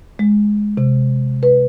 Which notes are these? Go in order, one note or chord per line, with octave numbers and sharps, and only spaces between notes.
G#3
C3
B4